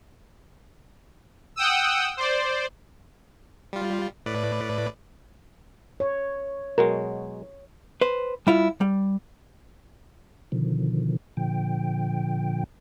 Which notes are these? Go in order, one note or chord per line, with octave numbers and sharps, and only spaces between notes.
F#5 G5 D#6 E6
C5 D5
G3 F4
A2 B4 D5
C#5
B2 F#3 G#3 A#4
B4 C5
G3 E4 F4
G3
B2 D3 D#3 F3
A#2 D3 F3 G5